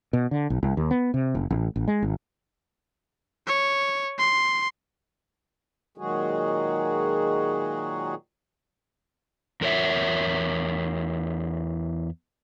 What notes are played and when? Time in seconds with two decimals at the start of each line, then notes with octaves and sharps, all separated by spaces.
0.13 B2
0.31 D3
0.50 B1
0.63 C2
0.77 D#2
0.91 B3
1.14 C3
1.35 F#1
1.50 A1
1.76 A1
1.88 G#3
2.02 G#1
3.47 C#5
4.18 C6
5.98 A#2 D#3 F#3 G#3 F#4 G#4
9.61 E2 A#4 C#5 E5